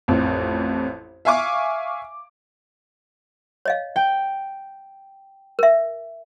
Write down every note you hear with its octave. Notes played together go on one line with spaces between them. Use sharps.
A1 F2
E5 F5 G#5 C#6 D6
C#5 D#5 F5
G5
A#4 E5